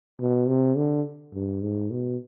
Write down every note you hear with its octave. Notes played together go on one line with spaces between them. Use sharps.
B2
C3
D3
G2
G#2
B2